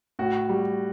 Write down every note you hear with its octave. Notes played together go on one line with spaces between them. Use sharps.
A2 F#4
G3